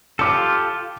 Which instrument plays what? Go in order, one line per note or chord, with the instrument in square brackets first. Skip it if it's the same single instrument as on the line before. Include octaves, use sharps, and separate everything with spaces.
[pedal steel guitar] F4 G4 A4 [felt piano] D6 C#7